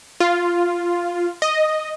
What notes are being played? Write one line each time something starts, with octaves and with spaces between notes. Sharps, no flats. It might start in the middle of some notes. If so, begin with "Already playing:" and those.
F4
D#5